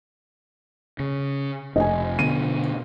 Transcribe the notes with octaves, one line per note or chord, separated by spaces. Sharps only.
C#3
F1 D#5 G#5
B2 D3 B3 D#7